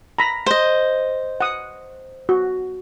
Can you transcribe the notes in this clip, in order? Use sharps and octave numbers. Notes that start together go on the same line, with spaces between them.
A#5 B5
C5 D#5
F#5 D#6
F#4